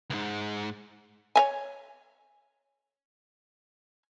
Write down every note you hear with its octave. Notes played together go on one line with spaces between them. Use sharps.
C#2 G#2
C#5 E5 G#5